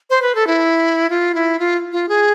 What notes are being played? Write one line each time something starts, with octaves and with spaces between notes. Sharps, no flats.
C5
B4
A4
E4
F4
E4
F4
F4
G#4